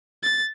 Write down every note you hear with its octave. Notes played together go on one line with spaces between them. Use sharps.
A6